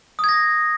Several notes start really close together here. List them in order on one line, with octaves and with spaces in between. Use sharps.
D#6 G#6 A#6